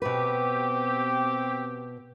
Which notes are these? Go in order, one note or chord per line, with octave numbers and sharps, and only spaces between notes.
B2 C4 G4 B4